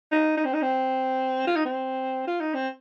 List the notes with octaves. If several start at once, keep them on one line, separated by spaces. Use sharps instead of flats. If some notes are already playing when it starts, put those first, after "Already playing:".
D#4
D#4
C4
D#4
C4
F4
D#4
C4
F4
D#4
C4